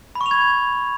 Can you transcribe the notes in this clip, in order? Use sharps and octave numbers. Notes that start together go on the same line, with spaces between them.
B5
C#6
F7
G#6